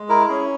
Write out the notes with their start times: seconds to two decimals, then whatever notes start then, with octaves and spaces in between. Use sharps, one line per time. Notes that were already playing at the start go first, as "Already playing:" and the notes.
Already playing: G#3
0.09 E4 A#4
0.29 C#4 G#4